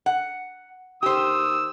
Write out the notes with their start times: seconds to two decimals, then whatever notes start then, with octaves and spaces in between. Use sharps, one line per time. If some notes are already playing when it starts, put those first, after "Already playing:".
0.06 F#5
1.03 D#3 G4 C5 D#6 E6